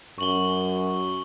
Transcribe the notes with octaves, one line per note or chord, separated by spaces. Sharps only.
F#2 C#6 F#7 G7